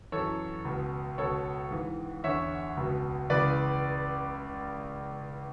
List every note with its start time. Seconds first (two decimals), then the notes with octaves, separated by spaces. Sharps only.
0.12 F#2 E3 A4 C#5
0.65 C#2 B2
1.18 C#2 B2 A4 C#5
1.71 G#2 E3
2.24 E2 D3 C#5 E5
2.77 C#2 B2
3.30 C#2 C#3 E3 B4 D5